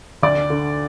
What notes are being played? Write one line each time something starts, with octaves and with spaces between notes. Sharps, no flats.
D2 D5 D6
D3